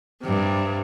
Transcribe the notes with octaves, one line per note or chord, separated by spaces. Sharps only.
G2 C3